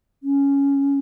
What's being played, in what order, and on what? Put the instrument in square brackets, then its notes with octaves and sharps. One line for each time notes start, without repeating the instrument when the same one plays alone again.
[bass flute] C#4